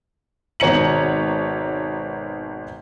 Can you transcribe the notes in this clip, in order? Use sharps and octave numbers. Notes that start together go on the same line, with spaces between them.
G#1 B2 C#5 A#5 C#7 F#7